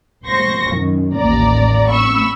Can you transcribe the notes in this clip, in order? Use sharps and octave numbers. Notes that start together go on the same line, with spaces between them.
C5 C6 C#6 A#6
F#2 D#3
A1 D#2 D5 A#5
B5 C#6 E6